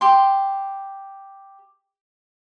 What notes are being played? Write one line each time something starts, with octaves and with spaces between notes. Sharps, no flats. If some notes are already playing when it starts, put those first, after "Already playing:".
G4 C6